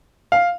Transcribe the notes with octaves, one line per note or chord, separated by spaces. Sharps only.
F5